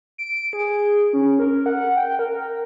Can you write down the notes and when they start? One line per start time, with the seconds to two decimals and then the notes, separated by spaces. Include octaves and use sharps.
0.18 D7
0.53 G#4
1.13 C#4
1.39 A#4
1.66 F#5
1.97 G5
2.19 A#4